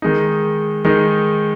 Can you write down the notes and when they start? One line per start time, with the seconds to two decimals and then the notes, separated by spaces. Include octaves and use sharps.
0.02 D#3 G#3 D#4
0.85 D#3 G#3 D#4